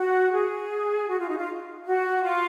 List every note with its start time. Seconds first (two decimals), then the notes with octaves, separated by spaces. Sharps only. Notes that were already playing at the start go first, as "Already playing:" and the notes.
Already playing: F#4
0.32 G#4
1.08 F#4
1.18 F4
1.29 D#4
1.38 F4
1.85 F#4
2.24 F4